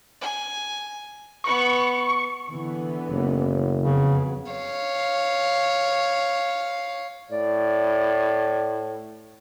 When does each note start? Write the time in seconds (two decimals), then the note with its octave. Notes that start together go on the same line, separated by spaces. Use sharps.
0.21 G#5
1.44 B3 B4 C#6
2.49 D3 E3 B3
3.10 F#1
3.82 F2 C#3 F#3 B3
4.52 C#5 F5
7.31 A2 D5